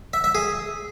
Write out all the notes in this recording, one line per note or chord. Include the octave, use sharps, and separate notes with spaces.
E5
E5
G#4